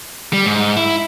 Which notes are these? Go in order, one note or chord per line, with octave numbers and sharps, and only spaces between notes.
G3
G#2
E4